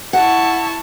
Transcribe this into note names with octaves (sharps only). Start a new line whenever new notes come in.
E4 F#5 A5 C#6